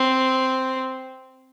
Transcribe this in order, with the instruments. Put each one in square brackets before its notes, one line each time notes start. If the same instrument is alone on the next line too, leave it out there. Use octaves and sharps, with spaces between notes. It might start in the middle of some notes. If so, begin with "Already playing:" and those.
Already playing: [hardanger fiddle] C4